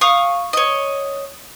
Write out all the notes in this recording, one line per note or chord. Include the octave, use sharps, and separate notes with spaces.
F5 C#6 D#6
C#5 D#5